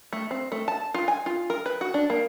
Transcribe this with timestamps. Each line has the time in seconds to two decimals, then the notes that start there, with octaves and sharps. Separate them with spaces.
0.13 A3
0.31 C4
0.52 A3
0.68 A5
0.94 F4
1.08 G#5
1.26 F4
1.50 A#4
1.66 B4
1.81 F#4
1.94 D4
2.10 A#3